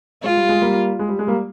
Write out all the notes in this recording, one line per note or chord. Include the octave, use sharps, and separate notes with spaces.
G#3 F4
G3
G#3
G3 A#3
G#3
G3
G#3
G3 A#3